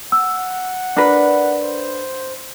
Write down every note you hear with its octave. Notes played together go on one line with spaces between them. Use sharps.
F#5 E6
D4 A#4 B4
C5